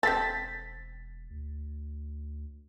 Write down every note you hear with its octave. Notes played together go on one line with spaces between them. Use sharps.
E1 C4 A4 A6 B6
D2